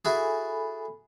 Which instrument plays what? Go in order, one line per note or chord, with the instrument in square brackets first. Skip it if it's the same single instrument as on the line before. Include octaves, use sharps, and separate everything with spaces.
[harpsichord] E4 F#4 G#4 [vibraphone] A4 G#5 B5